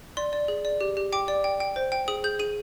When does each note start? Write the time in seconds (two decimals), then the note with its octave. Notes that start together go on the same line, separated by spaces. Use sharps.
0.17 D5 C6
0.33 D5
0.48 G#4
0.65 D5
0.81 G4
0.97 G4
1.12 G5 D6
1.28 D5
1.44 G5
1.60 G5
1.76 C5
1.92 G5
2.08 G#4 D#6
2.24 G#4 G6
2.39 G#4 D#7